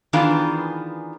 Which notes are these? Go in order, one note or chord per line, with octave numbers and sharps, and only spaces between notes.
D#3 E3 B3 D4 F4 G#4